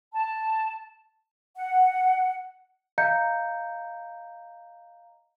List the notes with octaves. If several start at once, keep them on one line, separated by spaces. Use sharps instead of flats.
A5
F#5
D#5 F5 A#5 G6 C#7